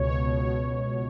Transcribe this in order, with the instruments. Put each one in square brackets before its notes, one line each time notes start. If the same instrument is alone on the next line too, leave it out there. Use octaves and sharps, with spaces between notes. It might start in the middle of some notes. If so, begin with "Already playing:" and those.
Already playing: [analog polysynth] C#2 B2 C#5
C#2 B2 C#5